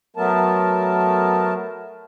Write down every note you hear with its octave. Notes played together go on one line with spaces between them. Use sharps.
F#3 A3 B3 A#4 A5